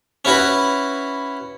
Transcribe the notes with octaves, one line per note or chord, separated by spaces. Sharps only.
C#4 E4 F#4 B4